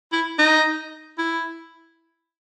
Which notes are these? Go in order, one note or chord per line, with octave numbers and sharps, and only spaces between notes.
E4
D#4
E4